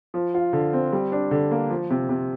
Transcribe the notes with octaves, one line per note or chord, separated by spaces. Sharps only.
F3
F4
D3
C4
G3
D4
D3
A#3
F3
C3
C3